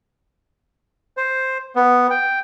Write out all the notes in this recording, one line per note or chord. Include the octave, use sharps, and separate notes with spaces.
C5
B3
G5